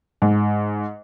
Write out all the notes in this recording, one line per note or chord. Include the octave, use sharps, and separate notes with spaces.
G#2